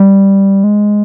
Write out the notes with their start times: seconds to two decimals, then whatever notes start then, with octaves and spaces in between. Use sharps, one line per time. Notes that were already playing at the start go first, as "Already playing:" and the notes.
Already playing: G3
0.64 G#3